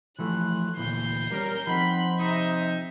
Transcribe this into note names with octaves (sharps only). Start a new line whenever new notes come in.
E3 F3 A3 F#6
D2 A#2 E3 G6 C7
G3 C#4 A#4
F3 C4 D#4 F#5 B5
C3 D#4 E5